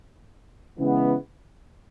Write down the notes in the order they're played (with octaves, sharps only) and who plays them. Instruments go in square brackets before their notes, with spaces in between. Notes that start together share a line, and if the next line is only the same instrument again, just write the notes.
[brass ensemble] C#3 E3 G#3 B3